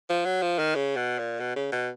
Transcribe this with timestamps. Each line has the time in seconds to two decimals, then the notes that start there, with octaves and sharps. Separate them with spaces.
0.09 F3
0.25 F#3
0.42 F3
0.59 D#3
0.75 C#3
0.96 B2
1.19 A#2
1.40 B2
1.56 C#3
1.72 B2